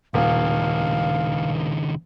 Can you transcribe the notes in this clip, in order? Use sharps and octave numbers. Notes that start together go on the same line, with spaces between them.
D#1 C#2 D#3 F5